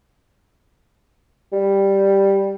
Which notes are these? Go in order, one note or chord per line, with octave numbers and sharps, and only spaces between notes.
G3